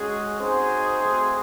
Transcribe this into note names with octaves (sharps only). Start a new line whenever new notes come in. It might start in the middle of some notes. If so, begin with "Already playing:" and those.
Already playing: G#3 C#4 F#4 G#4
C4 D#4 F#4 G#4 C5
A3 C4 F#4